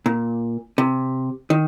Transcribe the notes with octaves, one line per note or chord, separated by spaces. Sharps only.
A#2
C3
D#3